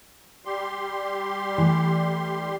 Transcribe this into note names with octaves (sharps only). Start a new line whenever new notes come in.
G3 G4 C6
E3 A3